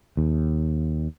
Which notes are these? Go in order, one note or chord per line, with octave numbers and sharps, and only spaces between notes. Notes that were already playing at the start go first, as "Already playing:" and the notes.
D#2